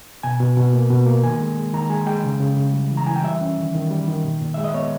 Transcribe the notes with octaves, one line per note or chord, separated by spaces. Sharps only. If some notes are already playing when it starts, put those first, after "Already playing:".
B2 G#5
B2
B2
A#3
B2
A#3
D#3 G#5
G#3
G#3
D#3 A#5
G#3 G#5
G#3 G5
C#3
C#3
C#3
G3
E3
A#5
E3 G#5
G5
G3 E5
C#4
D#3
D#3
G3
D#3
A#2
A#2
G#3 E5
D#5
B3 C#5